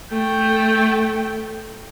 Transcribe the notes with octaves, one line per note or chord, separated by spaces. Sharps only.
A3 G5